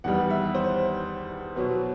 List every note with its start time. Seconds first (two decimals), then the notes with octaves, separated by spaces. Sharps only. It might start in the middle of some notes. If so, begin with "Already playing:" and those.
0.04 E2 D#3 G3 B3 F#5
0.31 E5
0.55 C5
1.56 B2 F#3 B3